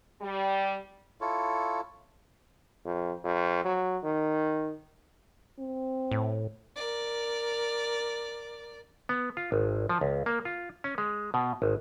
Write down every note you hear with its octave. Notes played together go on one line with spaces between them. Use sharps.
G3
E4 F4 A4 C#5
F2
F2
F#3
D#3
C4
A2
A#4 D5
B3
F4
G#1
F3
C#2
A#3
F4
C#4
G#3
B2
G#1